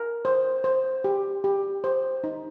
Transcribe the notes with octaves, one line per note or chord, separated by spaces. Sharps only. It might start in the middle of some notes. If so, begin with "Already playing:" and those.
Already playing: A#4
C5
C5
G4
G4
C5
D#4